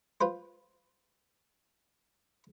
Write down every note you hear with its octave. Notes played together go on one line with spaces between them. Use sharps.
F4 B4 C5